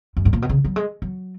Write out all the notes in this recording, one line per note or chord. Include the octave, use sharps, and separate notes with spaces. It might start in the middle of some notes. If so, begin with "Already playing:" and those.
F#2
G#2
A#2
B2
C#3
F#3
G#3
F#3